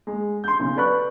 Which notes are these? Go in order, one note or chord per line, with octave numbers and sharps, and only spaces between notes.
G#3
C6 G6
B1 C#3
A4 B4 D5 B5 C#6 F#6